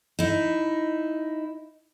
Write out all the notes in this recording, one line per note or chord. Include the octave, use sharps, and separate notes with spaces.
D#4 E4